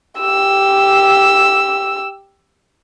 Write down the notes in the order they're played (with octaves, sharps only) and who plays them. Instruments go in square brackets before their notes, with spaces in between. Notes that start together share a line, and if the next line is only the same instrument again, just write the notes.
[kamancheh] G4 E6